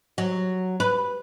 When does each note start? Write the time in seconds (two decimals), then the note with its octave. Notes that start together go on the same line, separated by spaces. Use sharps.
0.18 F#3
0.80 B4